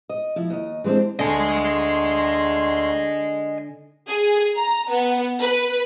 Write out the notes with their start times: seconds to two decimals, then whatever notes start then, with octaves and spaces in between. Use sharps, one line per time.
0.09 D#5
0.36 F3 E4
0.50 D#2 D#5
0.84 E3 G#3 A#3 C4 D4
1.19 D2 D3 D#5 G#5 C6
4.09 G#4
4.57 A#5
4.91 B3
5.40 B4